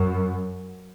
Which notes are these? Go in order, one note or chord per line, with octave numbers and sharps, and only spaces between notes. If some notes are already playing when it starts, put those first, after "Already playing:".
Already playing: F#2